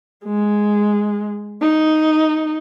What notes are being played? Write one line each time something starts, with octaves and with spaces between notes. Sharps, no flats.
G#3
D#4